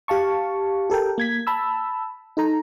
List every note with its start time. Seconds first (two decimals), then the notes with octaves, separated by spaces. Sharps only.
0.08 G4 F5 A5 C#6
0.90 G4 A4 A#4 G5
1.18 A#3 G#6 B6
1.47 A5 B5 E6
2.37 D#4 A4 A#5